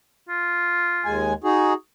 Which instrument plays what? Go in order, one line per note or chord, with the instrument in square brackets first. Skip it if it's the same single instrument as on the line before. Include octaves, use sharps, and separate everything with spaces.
[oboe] F4
[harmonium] D#2 G#3 G#5
D#4 F#4 G#4